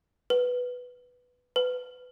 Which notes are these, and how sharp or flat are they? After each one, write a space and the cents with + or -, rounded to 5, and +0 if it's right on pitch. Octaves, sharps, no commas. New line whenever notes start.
B4 +5
B4 +25